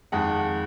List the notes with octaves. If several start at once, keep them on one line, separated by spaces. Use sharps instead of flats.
F2 D#3 G#3 F#5